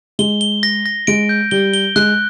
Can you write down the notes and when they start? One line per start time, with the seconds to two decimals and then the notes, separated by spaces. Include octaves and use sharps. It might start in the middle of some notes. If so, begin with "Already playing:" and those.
0.19 G#3 G7
0.41 G7
0.63 A#6
0.86 A#6
1.07 G#3 D7
1.29 G6
1.51 G3 G7
1.74 G7
1.96 G#3 F#6